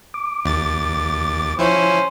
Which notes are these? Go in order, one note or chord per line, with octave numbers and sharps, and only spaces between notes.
D6
D#2 A6
F3 C#4 E4 C5